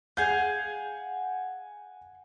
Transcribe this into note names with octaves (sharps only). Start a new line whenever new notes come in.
G#4 F5 F#5 G#5 G6